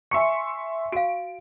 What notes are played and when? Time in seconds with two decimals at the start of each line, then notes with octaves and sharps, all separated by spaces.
0.11 E5 G#5 C6 C#6 C#7
0.92 F#4 F5 D7